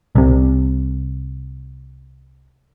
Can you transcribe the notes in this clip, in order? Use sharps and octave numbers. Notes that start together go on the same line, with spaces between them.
C2 C3